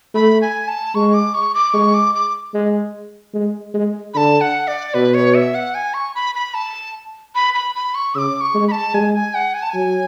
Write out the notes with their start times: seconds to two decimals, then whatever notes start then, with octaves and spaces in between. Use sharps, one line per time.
0.15 A3 B5
0.42 G#5
0.68 A5
0.95 G#3 C#6
1.14 D6
1.34 C#6
1.54 D6
1.74 G#3 C#6
1.94 D6
2.15 D6
2.54 G#3
3.34 G#3
3.74 G#3
4.14 D3 A5 B5
4.41 F#5
4.68 D5
4.94 B2 B4
5.14 C#5
5.35 E5
5.55 F#5
5.75 G#5
5.94 C#6
6.15 B5
6.35 B5
6.54 A5
7.35 B5
7.54 B5
7.75 B5
7.95 C#6
8.15 C#3 D6 E6
8.41 C#6
8.55 G#3
8.68 B5
8.72 A5
8.94 G#3 G#5
9.15 G#5
9.35 F#5
9.54 G#5
9.62 A5
9.70 F#3 G#5